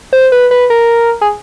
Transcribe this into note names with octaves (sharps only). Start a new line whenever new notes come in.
C5
B4
B4
A#4
G#4